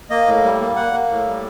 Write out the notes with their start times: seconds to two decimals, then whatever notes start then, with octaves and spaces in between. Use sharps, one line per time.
0.10 A#3 D#5
0.27 A2
0.43 G3
0.61 A#3
0.76 A#3 F#5
0.93 A#3
1.09 A2
1.27 G3